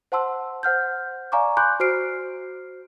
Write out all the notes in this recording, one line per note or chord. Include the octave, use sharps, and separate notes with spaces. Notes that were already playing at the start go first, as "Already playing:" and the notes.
C5 F#5 A5 C6 E6
C5 F#5 F6 G6
D5 F5 G#5 A#5 C#6 D6
G#5 B5 C6 D6 F#6 G6
F#4 C5 F6 C7 D7